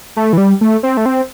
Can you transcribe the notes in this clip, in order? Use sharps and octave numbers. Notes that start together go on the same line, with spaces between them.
A3
E3
G3
A3
C4
A3
C4